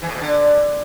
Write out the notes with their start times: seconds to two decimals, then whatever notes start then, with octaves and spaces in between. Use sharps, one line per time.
0.02 E3
0.08 A2
0.15 B2
0.21 D3